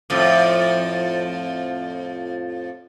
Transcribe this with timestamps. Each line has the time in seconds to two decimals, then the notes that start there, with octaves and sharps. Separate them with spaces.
0.10 F2 A2 F3